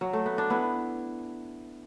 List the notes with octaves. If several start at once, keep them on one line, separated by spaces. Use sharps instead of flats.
F#3
A3
B3
D4
B3 E4